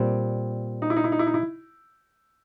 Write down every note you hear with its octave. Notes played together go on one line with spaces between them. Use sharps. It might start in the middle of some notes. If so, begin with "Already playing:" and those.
Already playing: A#2 G3 C4
D#4
E4
D#4
E4
D#4
E4
D#4
E4